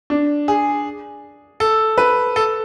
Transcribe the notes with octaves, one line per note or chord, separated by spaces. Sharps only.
D4
G#4
A4
B4
A4